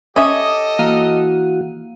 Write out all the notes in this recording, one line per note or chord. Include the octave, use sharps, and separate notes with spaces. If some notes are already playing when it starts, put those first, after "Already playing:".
C#4 G4 A4 D#5 E5 D6 D#6
E3 A#3 F#4 F5 D#7